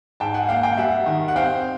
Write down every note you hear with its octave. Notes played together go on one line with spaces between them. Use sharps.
G#2 G5 A5
F#5 G#5
A#3 F5 G5
F5 G5
G3 E5 F#5
D#3
F#5
C4 F5 G5